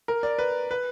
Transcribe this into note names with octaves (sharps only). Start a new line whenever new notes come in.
A#4
D5
B4
B4